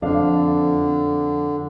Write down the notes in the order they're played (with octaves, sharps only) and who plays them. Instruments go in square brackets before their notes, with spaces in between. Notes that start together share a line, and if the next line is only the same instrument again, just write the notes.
[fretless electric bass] F2 [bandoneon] D3 [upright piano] F3 D4 F5